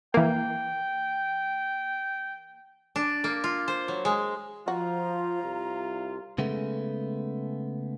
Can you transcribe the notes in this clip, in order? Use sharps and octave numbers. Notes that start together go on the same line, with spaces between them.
E3 A#3 G5
D4
A#3
F4
C5
F#3
G#3
F3 F4 F#4 A#5
C2
C#3 G#3 A3 B3